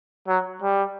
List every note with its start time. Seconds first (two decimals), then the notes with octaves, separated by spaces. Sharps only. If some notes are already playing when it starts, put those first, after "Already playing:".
0.28 F#3
0.62 G3